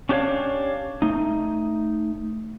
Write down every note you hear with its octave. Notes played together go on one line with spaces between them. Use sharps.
C#4 D4 G4 C5 C#5 F5
A3 D#4